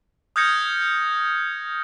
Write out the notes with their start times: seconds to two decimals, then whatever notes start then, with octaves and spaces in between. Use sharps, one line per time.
0.36 D#6 F6 G6 G#6 A#6 C#7